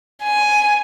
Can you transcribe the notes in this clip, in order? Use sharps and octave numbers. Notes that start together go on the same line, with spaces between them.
G#5